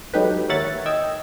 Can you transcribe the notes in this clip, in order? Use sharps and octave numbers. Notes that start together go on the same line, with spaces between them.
F#3 G#3 D#4 G4 A4 B4
D#2 A#4 C#5 E5 F#5 A6
D#5 G5 E6 G#6